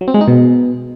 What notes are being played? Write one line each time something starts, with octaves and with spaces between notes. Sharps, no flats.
F#3
C4
G#3
D#4
B2